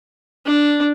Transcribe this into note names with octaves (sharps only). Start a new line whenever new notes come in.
D4